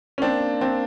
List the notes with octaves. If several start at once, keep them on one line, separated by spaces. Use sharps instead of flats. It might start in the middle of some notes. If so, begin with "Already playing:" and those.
C#4
A#3 C4 D4
C4 D4